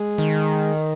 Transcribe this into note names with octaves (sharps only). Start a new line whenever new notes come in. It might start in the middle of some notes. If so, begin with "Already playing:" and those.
Already playing: G#3 G#4
D#3